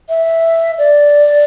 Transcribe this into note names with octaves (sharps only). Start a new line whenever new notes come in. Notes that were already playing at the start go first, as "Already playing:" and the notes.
E5
D5